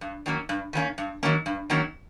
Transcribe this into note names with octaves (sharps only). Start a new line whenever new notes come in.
G2
D#3 F#3 A#3 C#4
G2
D#3 F#3 A#3 C#4
G2
D#3 F#3 A#3 C#4
G2
D#3 F#3 A#3 C#4